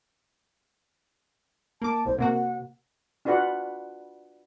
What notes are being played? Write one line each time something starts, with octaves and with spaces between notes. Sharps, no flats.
A#3 A5 D6
C2 C5
C3 A#3 F#4 F#5
D4 F4 F#4 B4 F#5